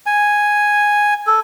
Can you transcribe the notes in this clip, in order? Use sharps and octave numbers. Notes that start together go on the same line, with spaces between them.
G#5
A4